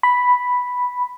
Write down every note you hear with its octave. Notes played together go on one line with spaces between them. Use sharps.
B5